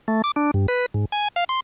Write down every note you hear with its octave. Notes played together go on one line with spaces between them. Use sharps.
A3
D6
D4
G2
B4
G#2
G#5
F5
C6